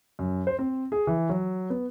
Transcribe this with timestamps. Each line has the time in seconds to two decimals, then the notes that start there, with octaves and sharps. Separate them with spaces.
0.19 F#2
0.47 C5
0.59 C4
0.92 G#4
1.07 E3
1.29 F#3
1.70 B3